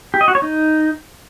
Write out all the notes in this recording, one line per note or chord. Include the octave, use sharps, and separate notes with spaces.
G4
D#5
F#4
C#5
D#4